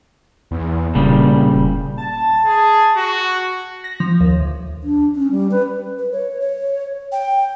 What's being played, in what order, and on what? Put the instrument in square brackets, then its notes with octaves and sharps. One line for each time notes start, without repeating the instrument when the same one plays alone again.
[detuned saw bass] E2
[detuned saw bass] E1 [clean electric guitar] A#2 C#3 G3
[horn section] A5
[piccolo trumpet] G#4
F#4
[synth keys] A#6
F3
D#2
D2
[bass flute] D4
C#4
G3
B4
[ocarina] B4
C#5
C#5
G5